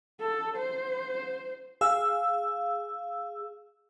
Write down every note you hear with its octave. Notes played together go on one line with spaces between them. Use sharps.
A4
C5
G#4 F5 E6